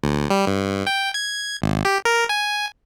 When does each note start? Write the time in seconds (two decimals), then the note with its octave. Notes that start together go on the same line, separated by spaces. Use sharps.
0.03 D2
0.30 G3
0.47 G2
0.87 G5
1.14 G#6
1.62 G#1
1.85 G4
2.05 A#4
2.29 G#5